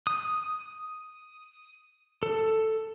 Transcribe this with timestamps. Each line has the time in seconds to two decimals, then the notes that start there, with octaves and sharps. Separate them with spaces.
0.07 D#6
2.23 A4